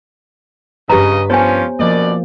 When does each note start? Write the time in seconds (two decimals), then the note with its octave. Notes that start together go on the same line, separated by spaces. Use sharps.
0.89 G2 C#3 G4 B4 D#5 A#5
1.30 F3 B3 C#4 C5 C#5 G#5
1.80 F#2 B2 F3 A#3 D5 D#5